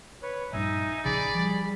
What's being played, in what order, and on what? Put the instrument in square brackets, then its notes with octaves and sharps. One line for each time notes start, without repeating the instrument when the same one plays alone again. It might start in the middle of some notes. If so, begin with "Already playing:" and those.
[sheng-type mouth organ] B4 C#5
[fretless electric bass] A#1 G2 [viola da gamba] D#4 [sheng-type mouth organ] E5 G#5
[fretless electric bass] A#1 C#3 [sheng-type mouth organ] G#4 B5 [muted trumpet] D5
[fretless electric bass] F3 [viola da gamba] G3